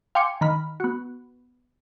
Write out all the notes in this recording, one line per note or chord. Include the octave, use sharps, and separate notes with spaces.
F5 G5 G#5 C6 D6 C#7
D#3 B5 F6
B3 F#4